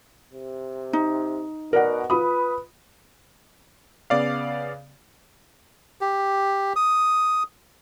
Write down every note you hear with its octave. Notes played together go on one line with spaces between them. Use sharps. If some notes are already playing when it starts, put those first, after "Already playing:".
C3
D#4
B2 A#4 D5 F#5
F4 B4 B5 D#6
C#3 B3 D5 F5
G4
D#6